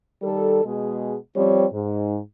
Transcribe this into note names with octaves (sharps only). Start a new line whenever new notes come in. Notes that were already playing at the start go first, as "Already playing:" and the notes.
D#3 G3 A4
B2 G#3 G#4
F3 G3 C4 C#5
G#2